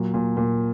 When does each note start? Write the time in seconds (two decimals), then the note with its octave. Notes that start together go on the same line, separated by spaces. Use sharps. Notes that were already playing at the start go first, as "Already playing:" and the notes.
Already playing: A#2 F#3
0.14 A#2
0.37 A#2